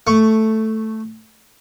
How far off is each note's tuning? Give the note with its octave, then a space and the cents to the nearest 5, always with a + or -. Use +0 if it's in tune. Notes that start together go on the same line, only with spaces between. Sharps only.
A3 +0 C#6 +0